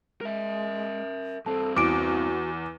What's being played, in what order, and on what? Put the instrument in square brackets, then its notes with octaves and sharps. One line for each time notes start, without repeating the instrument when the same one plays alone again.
[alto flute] G#3 [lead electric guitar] A#4 E5
[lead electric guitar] G2 C4 [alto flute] A4 [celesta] A5
[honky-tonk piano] E2 [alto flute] F#4 [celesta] D6 D7